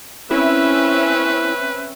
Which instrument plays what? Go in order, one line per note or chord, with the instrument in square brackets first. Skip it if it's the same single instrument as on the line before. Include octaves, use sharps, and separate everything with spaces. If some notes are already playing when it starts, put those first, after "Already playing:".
[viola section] C4 C#4 E5 [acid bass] E4 [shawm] B4